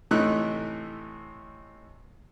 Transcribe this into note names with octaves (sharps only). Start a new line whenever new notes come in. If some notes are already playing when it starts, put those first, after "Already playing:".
A2 C3 E3 A3 D#4 F#6